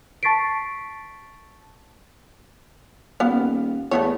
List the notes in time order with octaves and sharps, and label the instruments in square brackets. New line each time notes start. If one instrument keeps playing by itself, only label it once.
[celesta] A5 C#6 A6 B6 C7 D7
[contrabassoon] D#1 [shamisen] B3 F5
[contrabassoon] E2 [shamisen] A3 B3 C#5